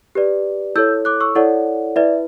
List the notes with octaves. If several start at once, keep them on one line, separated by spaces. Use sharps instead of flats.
G4 B4 D5
E4 A4 C#5 E6 G6
D6 F#6
C#6 E6
E4 A4 C#5 D5 F#5
E4 B4 D5 E5